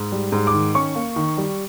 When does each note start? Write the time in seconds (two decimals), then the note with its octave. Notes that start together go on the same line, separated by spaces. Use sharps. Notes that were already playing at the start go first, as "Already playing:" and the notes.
Already playing: G#2
0.12 G3
0.32 G#2
0.47 D6
0.53 D#3
0.75 C#4 C#6
0.95 A#3
1.16 D#3
1.37 G3